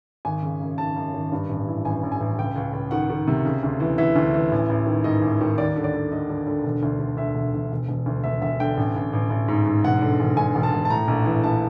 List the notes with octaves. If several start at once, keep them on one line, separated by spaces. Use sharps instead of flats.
G#1 G#5
C#3
F#2
G#1 A5
F#2
G#1
G2
A1
E3
A1 G#5
A1
G#5
A1
C#2 G5
C#2
C#2
D#3 F#5
D#3
C3
C#3
D2
E3
E3 E5
D2
E3
A1
A1
D#3
G#2 D#5
A1
D#3
D#2 D5
D3
D5
D3
D3 D#5
D3
D3
E1
D2
D3
D2 E5
E1
E1
E1
E1
D2
E1 E5
E1 E5
D3 G5
A1
A1
A1
A1
G#2
G#2
E1 F#5
D3
E1
E1 G#5
E1
A5
E1
A5
A2 A#5
A#1
E3
A#1 A5